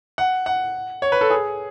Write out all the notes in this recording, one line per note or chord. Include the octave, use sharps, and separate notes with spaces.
F#5
F#5
C#5
B4
A4
G#4